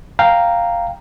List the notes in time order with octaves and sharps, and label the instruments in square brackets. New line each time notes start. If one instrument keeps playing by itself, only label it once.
[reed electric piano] F5 G5 A#5